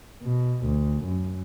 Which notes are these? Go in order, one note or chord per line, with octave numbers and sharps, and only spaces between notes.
B2
D2
F#2